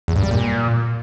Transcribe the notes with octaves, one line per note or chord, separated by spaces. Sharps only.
E2
G2
G3
A#2